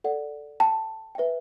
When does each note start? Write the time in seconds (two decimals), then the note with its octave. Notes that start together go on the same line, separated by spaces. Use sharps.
0.04 A4 D5 F#5
0.60 G5 A5
1.15 B4 E5 G5